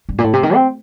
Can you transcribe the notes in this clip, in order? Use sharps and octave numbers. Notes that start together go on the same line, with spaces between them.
G2
A#2
A2
C3
D#3
C4